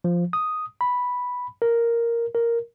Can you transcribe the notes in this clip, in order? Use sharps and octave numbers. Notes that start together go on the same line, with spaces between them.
F3
D#6
B5
A#4
A#4